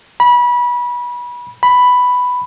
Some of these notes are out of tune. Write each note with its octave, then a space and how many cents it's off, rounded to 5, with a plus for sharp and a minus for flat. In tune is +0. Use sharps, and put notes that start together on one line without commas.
B5 -25
B5 +5